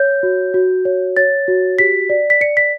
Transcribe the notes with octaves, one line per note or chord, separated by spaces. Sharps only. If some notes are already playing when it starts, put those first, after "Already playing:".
Already playing: C#5 G6
F#4
F#4
C#5
C#5 A6
F#4
G4 B6
D5
B6
D5 C#7
B6